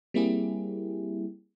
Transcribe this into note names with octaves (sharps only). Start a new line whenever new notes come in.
G3 A#3 C4 E4 G4 G#4